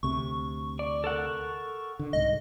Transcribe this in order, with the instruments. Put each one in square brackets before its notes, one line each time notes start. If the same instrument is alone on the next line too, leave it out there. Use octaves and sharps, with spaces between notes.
[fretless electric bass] D2 C3 [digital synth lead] C#6
[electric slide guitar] D5
A4 A#4 F#5
[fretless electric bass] D3
[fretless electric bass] C2 G#2 [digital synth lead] D#5